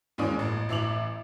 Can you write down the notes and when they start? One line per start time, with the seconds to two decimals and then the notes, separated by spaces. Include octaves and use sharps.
0.18 D#2 G#2 E3 C#4 D5 D#6
0.39 A1
0.69 A1 E3 E5 D6 F7 F#7